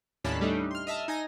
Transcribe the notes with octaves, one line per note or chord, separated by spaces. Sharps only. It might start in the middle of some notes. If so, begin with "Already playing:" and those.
D#2 A2 C#4 D4 A5 B5
G3 A3 D4 D#4
C6 F6
D#5 E5 A5 F6
D#4 G#5 A#6